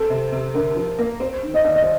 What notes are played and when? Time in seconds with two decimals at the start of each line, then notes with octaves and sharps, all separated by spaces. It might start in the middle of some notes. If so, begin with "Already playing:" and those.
Already playing: C4 A4
0.10 C3
0.32 C3
0.54 D3 A#4
0.76 F3
0.99 A#3
1.20 C4 C5
1.43 D#3
1.54 D#5
1.64 D#2 D5
1.75 D#5
1.82 C5